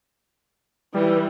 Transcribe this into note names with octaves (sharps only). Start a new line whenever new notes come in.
E3 G3